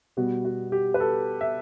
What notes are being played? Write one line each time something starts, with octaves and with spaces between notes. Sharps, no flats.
B2 G3 B3 F#4
F#4
G4
B4
A4
E5